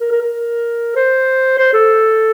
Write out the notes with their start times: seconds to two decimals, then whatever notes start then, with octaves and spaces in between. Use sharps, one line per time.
0.01 A#4
0.11 A#4
0.22 A#4
0.96 C5
1.58 C5
1.74 A4